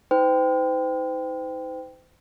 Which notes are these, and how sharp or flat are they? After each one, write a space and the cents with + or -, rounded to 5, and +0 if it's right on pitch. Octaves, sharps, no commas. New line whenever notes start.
D#4 +40 C5 -40 G5 +0